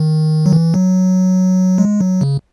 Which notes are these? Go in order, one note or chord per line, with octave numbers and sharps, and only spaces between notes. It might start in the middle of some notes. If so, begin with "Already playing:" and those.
Already playing: D#3
F#3
E3
F#3
G#3
F#3
C#3